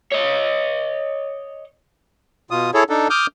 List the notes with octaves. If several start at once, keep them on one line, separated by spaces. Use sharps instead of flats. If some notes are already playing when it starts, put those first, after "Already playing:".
C#5 D#5
B2 F4 D#6
E4 G#4 A4 C#5
D4 D#4 A4
D6 D#6 F6 G6